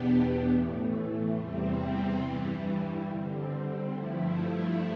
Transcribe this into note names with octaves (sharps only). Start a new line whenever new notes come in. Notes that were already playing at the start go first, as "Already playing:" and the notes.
Already playing: E2 B2 B3 D4 G4
A2 E3 A3
E2 C3 G3 C4
G2 E3 G3
D3 G3 C4
G2 F3 A3 E4